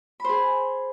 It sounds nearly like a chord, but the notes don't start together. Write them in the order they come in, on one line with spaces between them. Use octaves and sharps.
B5 C5 G#4